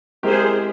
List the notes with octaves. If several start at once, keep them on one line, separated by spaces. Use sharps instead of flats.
G#3 C4 E4 G4 G#4 A#4 C5